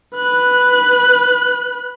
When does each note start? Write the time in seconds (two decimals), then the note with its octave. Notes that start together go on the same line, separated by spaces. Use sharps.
0.15 B4 F#6